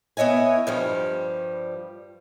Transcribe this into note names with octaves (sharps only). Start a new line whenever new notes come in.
B3 E4 C#5 D#5 G#5
G2 F3 G3